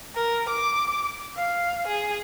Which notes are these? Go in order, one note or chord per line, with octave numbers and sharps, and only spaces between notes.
A#4
D6
F5
G#4